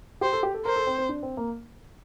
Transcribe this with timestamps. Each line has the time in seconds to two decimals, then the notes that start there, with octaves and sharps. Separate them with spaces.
0.21 G4 C5
0.33 A4
0.43 G4
0.54 A4
0.65 A#4 C5
0.76 A4
0.87 C4
0.98 C4
1.09 D4
1.23 C4
1.37 A#3